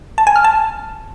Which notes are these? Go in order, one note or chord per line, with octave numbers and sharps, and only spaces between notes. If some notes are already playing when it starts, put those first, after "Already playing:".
A5
G#5
F6
A5